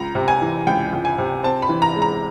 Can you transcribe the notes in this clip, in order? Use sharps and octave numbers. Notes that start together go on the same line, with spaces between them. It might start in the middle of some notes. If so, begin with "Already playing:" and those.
Already playing: C#2 A#5
C3
G#5
E3
C#2 G5
C#2
G#5
C3
C4 A5
B5
E3
A#5
G#3
A#5